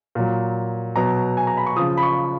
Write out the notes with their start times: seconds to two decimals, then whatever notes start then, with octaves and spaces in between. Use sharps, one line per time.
0.15 A#2 F#3
0.96 B2 F#3 A#5
1.37 G#5
1.47 A#5
1.57 B5
1.66 C#6
1.76 C#3 F3 D#6
1.97 B5
2.03 C#6